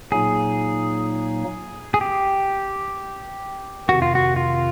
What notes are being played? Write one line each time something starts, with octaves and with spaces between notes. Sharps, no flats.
A#2 F#3 A#3 D#4 G#4
G#4
G4
F2 C3 D#3 F#4
F4
F#4
F4